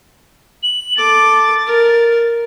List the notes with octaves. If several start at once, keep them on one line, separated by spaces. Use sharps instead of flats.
F#7
A4 D6 A6
A#4